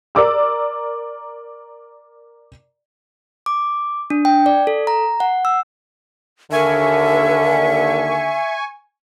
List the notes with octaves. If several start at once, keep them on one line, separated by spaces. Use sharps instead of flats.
A#4 D5 D6 E6
D6
D4
G5
D5
A4
A#5
F#5
E6
D#2 D3 A#4 E5 G#5 C#6